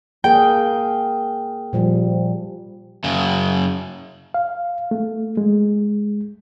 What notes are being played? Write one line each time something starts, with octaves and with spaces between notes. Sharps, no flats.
A#3 G#4 A#4 G5
A#2 F3 G3
F#2 C#3
F5
A3
G#3